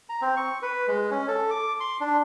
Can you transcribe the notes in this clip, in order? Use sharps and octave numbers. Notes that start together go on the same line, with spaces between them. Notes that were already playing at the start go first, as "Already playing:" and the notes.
A#5
C4
C#6
B4
G#3
C#4
A4
D6
C6
D4